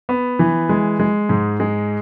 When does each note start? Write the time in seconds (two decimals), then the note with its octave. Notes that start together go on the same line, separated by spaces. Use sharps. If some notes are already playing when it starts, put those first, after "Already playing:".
0.09 B3
0.39 E3
0.69 G#3
1.00 G#3
1.29 G#2
1.60 G#3